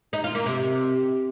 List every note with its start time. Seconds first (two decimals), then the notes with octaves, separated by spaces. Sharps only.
0.13 D#4
0.24 F4
0.35 A#3
0.46 C3